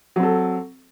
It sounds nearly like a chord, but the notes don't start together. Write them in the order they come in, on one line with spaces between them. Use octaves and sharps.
F#3 C4 A4